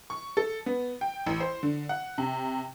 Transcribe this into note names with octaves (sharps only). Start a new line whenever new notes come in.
C#6
A4
B3
G5
A1
C5
D3
F#5
C3